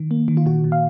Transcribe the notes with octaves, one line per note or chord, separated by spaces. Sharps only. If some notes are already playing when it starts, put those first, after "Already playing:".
Already playing: D#3
A#3
D#3
F4
A#2 F#4
A#2
F5